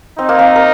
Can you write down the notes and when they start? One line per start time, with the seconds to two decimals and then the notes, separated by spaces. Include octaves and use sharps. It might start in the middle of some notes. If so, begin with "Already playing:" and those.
0.19 C4 D#4
0.29 A#3
0.39 C4
0.56 A#4